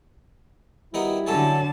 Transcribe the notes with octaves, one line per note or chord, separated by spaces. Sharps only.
D#3 G3 B3 D#4 E4 F#4 G4
D3 F#3 C#4 A4 A5